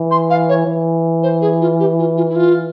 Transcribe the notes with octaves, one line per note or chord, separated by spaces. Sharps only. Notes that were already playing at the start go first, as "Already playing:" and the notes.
Already playing: E3
C6
F5
C#5
E3
C5
G#4
F4
G4
F4
F4
E4
F4